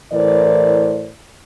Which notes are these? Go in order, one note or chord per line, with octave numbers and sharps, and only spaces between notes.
A2 E3 A#4 C5 D5